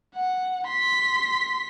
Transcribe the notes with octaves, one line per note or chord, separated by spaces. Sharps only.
F#5
C6 B6